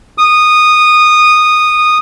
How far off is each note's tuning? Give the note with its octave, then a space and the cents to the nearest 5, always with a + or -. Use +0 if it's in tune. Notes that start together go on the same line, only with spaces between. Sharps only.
D#6 -15